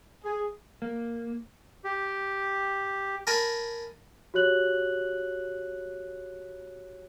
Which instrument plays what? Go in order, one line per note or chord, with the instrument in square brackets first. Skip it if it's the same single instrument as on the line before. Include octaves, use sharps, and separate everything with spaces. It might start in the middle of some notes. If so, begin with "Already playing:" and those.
[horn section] G#4
[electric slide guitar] A#3
[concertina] G4
[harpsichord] A#4 G#5 A5 B5
[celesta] F#4 G4 C#5 F#6 F#7